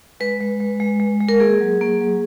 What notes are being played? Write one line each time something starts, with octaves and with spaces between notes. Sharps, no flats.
G#3 B4
G#3
G#3
G#3
G#3
G#3
A#4
A#3 G#4
F#3
A#3
F#3